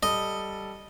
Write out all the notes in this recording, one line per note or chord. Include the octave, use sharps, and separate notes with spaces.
G3 A4 D#5